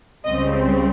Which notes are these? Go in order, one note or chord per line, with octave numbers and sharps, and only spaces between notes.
C#2 C#3 G3 C4 D#5